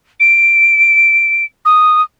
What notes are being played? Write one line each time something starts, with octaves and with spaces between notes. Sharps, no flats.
D7
D#6